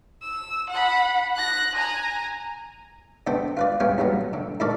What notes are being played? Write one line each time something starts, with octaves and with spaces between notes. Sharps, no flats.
E6
F#5 B5
F#6 A#6
G#5 A#5
D3 B3 D4 C5 G5
F4 B4 D5
G2 B3 C#4 F4 G5 G#5
D#2 F#3 G3 B3
D3
A2 D#3 A4 A#4 D5 B5